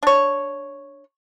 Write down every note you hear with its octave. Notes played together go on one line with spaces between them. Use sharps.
D4 C#5